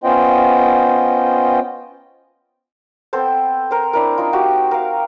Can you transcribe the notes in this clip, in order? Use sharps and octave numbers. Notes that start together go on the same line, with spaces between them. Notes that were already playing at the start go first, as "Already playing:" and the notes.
B3 C#4 F4 C5 D#5 G5
B3 C4 A4 C5
A#4 C5
D4 E4 A#4
D#4 F4
F#4 G4
A#4 F5